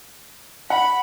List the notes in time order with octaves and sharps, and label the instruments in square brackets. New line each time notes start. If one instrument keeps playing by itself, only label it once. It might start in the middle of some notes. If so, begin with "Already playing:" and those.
[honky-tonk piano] F#5 [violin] B5